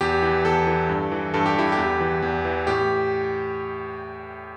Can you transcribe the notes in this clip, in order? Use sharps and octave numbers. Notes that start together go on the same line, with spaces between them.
E2 G4
E3
E2 A4
E3
G2
E3
G2 A4
G4
E3 E4
G4
E2
E3
E2
E3
A2 G4